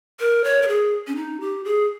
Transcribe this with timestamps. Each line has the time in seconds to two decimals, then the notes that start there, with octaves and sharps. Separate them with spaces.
0.20 A#4
0.44 C#5
0.62 A#4
0.68 G#4
1.07 C#4
1.16 D#4
1.41 G4
1.65 G#4